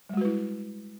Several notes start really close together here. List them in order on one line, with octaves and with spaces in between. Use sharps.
G3 G#3 F#4 B4 E4